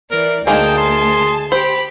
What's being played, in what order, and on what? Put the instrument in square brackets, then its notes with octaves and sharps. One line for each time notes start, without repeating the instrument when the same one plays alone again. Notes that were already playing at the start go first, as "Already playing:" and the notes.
[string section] E3 D5 [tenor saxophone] A#4
[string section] D2 A5 [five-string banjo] G#3 A#3 D#4 [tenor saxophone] G#4 [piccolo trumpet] G5
[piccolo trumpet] C6
[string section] G4 [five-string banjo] C5 [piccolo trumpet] B5